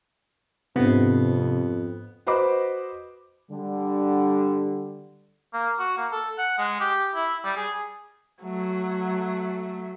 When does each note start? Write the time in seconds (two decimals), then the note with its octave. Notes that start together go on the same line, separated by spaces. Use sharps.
0.76 F2 G#2 C3 B3 D4
2.27 F#4 B4 C5 D#5 B5 D6
3.51 D3 G3
5.54 A#3
5.79 F#4
5.98 A#3
6.12 A4
6.38 F#5
6.58 G#3
6.80 G4
7.15 E4
7.45 G3
7.57 G#4
8.42 F#3 A3